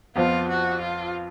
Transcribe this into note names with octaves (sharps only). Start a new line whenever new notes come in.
F2 F3 B3 F4
F#4
F4